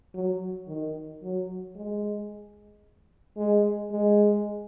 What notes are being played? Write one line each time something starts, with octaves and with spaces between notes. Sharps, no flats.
F#3
D#3
F#3
G#3
G#3
G#3